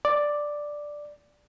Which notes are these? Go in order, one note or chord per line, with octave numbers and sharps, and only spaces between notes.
D5